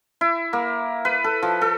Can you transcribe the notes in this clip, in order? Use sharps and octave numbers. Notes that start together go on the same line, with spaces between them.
E4
A#3
B4
A4
F3
A4